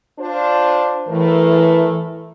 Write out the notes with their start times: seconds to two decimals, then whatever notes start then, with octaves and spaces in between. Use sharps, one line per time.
0.19 D4 F4 C5
1.09 A2 E3 A3 A#4